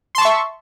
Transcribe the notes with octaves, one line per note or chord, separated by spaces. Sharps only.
E5 A5 C6 C#6